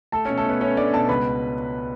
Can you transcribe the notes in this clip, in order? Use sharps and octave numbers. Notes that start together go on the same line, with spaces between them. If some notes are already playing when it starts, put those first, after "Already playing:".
A3 A4 A5
B2 C#4 C#5
A3 A4
B2 B3 B4
A3 C#4 C#5
A3 D4 D5
B2 A4 A5
C#2 B4 B5